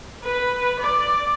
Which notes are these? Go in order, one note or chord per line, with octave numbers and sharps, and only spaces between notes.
B4
D5